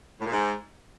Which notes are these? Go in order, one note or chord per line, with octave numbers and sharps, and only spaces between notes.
A2
A#2
G#2